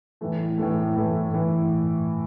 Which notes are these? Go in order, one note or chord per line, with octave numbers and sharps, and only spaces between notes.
A2 E3 A3
A2 E3 A3
A2 E3 A3
A2 E3